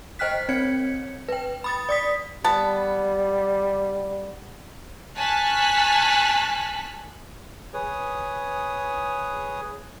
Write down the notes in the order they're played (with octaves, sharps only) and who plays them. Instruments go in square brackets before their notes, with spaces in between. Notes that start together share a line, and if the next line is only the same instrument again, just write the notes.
[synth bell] C5 D#5 G5 F6 F#6 B6
C4 C#5 G#6 C#7
B4 G5
B5 D#6 A6
D5 D#6 B6
[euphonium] G3 [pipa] B3 A5
[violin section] G#5 A5 C#6 F6 F#6 B6
[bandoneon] G#4 B4 C#5 D#6